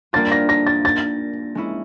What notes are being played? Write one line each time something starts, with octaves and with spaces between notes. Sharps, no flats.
G3 A#3 D4 F4 A6
A#6
A#6
A6
A6
G#3 C#4 E4